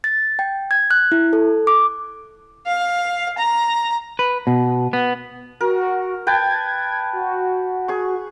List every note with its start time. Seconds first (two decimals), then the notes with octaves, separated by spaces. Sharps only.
0.04 A6
0.39 G5
0.71 G#6
0.91 F#6
1.12 E4
1.33 A4
1.67 D6
2.67 F5
3.38 A#5
4.19 B4
4.47 B2
4.93 B3
5.61 F#4 A#4
6.27 B4 G5 A5 G#6
7.13 F#4
7.88 G#4 C#6